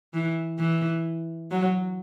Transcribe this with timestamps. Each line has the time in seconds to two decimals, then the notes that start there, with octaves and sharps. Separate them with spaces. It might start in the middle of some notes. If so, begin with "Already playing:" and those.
0.14 E3
0.59 E3
1.51 F#3